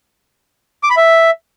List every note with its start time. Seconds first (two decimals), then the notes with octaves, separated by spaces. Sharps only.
0.83 D6
0.90 B5
0.97 E5